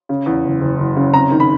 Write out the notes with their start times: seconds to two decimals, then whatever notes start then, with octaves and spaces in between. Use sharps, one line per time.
0.09 C#3
0.26 E2
0.45 F#1
0.61 F#1
0.78 F#1
0.96 C#3
1.14 C3 A#5
1.31 D#3
1.40 B5